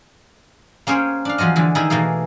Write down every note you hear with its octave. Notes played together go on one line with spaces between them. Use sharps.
A#3 C#4 G#4 C5 C#5 G5
D4 F5
E2 F3 F#3 F4 D#5
D3 E3 G#3
D#3 D#4 E4 G#4 D#5
B2 E3 A3 A#3 G#4